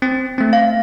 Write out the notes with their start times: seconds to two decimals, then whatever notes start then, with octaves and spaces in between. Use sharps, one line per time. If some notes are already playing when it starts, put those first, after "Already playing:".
0.02 C4
0.38 A3 C4
0.53 F5